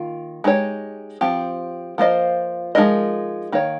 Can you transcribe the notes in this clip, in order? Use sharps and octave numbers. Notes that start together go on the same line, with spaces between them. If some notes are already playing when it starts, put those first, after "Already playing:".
Already playing: D#3 A#3 F4
G#3 D#4 G4 C#5
F3 C4 G4
F3 A#3 F4 C5 D#5
F3 G#3 D#4 A#4 D#5
D#3 A#3 C#5